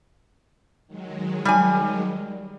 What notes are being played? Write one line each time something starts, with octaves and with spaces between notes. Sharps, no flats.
D#3 F#3 G#3
G3 G#5